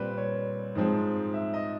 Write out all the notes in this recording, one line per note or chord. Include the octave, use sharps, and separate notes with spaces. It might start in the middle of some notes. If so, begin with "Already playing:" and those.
Already playing: A#2 G3 C4 B4
C#5
G#2 F3 G#3 C4
E5
D#5